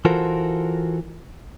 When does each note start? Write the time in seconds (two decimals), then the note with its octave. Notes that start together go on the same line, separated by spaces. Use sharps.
0.05 E3 F4 F#4 A4 A#4 C5